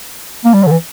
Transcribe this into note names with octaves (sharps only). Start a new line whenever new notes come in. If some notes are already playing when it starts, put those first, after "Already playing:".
A#3
G3
F#3
D3
E3